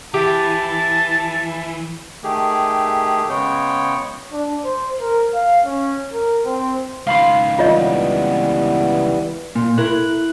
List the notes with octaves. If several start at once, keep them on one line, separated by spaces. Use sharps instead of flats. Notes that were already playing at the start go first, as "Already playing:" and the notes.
E3 G4 E5 A5
D#3 A3 G4 G#4
C#3 G#3 B3 C#5 G5
D4
C5
A#4
F5
C#4
A#4
C4
C#2 D#3 F5 B5 C6
E3 G3 B3 F4 C#5 D#5
A#2 A#3
E4 A#4 F#6